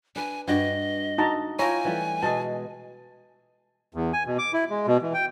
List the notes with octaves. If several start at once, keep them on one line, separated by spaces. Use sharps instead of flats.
D4 B4 G#5
G2 F#4 D5 D#5
D#4 F#4 A5 A#5
E4 F4 C#5 G5 G#5 A#5
E3 G3 A3
B2 G#3 G#4 A5
E2
G#5
B2
D6
E4
G#3
B2
E3
G5